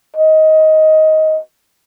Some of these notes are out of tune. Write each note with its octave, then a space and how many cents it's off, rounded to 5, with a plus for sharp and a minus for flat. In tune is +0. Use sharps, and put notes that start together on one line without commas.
D#5 +15